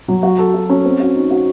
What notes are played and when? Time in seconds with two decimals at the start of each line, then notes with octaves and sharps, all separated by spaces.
0.08 F#3
0.23 F#4
0.38 A4
0.54 F#4
0.70 C#4
0.85 C4
1.00 F#4
1.15 D#4
1.31 F#4